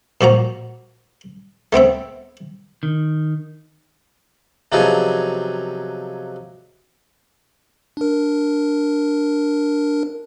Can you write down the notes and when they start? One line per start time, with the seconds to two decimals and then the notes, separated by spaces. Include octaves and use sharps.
0.21 A#2 F3 F#4 A#5
1.73 A3 B3 C4 E5
2.83 D#3
4.72 C3 F3 F#3 B3 D#4 G#4
7.97 D4 A#4